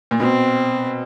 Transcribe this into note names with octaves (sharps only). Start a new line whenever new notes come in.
A#2
B2 C4